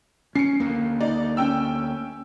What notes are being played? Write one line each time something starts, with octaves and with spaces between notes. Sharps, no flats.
C#4 C7 C#7
D2 A#3
D#4 D5
C#4 G5 E6